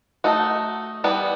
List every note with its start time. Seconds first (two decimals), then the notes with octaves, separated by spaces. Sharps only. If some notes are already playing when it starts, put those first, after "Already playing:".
0.24 A3 D#4 F#4
1.04 E3 G3 B3